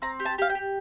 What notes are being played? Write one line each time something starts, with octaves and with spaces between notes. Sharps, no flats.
C4 A#5
G4
A5
G4 F5
G5
G4